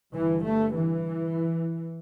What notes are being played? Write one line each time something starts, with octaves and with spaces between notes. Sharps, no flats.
G1 G2 E3
A3
E3